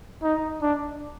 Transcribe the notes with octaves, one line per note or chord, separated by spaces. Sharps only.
D#4
D4